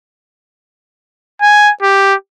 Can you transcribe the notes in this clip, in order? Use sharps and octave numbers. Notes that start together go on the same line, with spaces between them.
G#5
G4